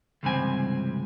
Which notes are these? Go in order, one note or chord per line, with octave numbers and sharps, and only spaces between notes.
C#2 G2 C3 E3 C4 G#5